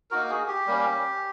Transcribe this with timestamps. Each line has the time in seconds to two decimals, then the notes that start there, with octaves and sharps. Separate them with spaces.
0.11 A#3 D#4 F#4 A#4
0.30 G#4
0.48 G4
0.67 G3 A#3 C#4